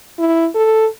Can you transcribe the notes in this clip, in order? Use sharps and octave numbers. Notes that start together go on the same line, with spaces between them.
E4
A4